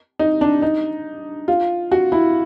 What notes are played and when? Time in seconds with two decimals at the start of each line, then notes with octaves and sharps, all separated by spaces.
0.19 D#4
0.41 D4
0.62 D#4
1.48 F4
1.92 F#4
2.12 E4